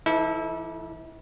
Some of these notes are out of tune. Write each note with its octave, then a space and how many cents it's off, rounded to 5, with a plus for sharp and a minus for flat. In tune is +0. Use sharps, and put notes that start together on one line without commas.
E3 +30 E4 -40 A4 -5